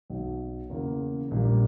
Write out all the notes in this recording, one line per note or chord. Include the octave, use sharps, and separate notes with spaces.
B1 B2 F#3
E2 C#3 E3 A#3
A#1 A#2 G3 A#3